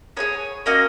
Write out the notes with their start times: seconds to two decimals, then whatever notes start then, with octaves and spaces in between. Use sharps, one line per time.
0.17 B3 D#4 G#4 C#5
0.66 A#3 C#4 F#4 D#5